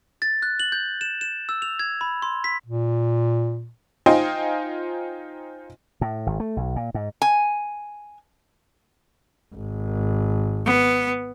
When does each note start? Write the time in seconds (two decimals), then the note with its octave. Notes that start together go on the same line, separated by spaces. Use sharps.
0.22 A6
0.42 F#6
0.60 F#7
0.72 G6
1.01 E7
1.21 E7
1.49 E6
1.62 F7
1.79 G#6
2.01 B5
2.22 C6
2.44 B6
2.66 A#2
4.06 D#4 F4 C5 D#5 G5 G#5
6.01 A2
6.26 G#1
6.40 A3
6.57 B1
6.76 A#2
6.94 G#2
7.22 G#5
9.54 G#1
10.66 B3